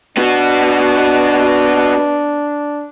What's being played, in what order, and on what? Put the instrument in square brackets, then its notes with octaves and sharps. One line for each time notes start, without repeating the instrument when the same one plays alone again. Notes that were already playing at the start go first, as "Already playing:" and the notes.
[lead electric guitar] B3 F#4 [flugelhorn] D4